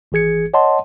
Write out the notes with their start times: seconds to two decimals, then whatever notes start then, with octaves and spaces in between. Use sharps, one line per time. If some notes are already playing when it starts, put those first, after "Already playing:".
0.12 G#1 E3 G#4 G#6 C#7
0.54 C#5 D#5 F#5 A5 C6